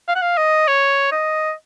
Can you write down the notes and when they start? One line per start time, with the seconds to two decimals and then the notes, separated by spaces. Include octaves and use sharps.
0.08 F5
0.15 F#5
0.22 F5
0.37 D#5
0.68 C#5
1.12 D#5